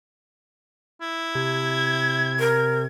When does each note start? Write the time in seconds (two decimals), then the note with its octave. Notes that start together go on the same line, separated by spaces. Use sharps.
1.01 E4
1.35 C3 G#6
2.40 A#4